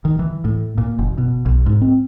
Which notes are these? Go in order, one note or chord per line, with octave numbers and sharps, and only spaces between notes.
D#3
E3
A2
A#2
F#1
B2
B1
G#2
C4